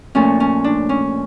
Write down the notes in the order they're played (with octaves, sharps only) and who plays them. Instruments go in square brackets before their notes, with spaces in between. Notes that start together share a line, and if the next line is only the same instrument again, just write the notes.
[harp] A#2 F3 A3 C#4
C#4
D4
C#4